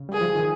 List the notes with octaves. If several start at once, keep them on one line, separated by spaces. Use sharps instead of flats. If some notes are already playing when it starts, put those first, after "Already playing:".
Already playing: C#3
G3 G#4
F3
D#3